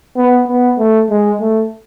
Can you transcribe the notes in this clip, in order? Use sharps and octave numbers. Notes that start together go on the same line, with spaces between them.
B3
B3
A3
G#3
A3